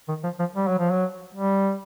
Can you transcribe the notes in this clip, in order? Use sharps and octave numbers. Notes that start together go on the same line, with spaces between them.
D#3
F3
F3
G3
F#3
F3
F#3
G3